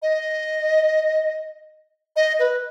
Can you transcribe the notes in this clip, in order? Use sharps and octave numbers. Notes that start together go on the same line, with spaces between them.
D#5
D#5
B4